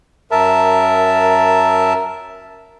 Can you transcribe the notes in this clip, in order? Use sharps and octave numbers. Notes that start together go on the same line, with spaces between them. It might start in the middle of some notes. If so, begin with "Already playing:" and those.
F#2 A#4 E5 A5